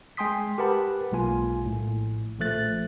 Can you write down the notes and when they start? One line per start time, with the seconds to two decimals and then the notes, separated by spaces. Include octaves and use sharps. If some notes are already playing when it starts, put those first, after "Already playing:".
0.17 G#3 G5 G#5 C6 D#6 B6
0.58 G4 A#4 B4 F#5 A5 B5
1.12 B1 G#3 A#3 F4 G#5
1.63 A#1 A2
2.40 A#1 F3 A3 F#6 A6